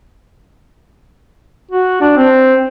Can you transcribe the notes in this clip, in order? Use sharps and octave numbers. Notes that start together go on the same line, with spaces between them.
F#4
D4
C4